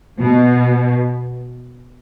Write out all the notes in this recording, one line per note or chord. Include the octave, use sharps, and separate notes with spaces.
B2